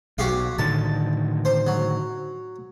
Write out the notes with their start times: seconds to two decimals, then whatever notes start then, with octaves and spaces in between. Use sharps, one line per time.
0.18 B1 F#4 G4 F5
0.59 A2 D3 D#3 A5
1.45 C5
1.67 F#3